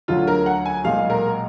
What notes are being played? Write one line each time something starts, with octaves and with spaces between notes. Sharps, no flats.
D2 D3 F#3 F4
A#4
F#5
G#5
B1 A#2 G#3 F5
A#4